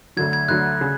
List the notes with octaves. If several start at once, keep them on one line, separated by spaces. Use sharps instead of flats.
D2 D3 F#3 G#6
G#6
D2 D3 F#3 F#6
C#3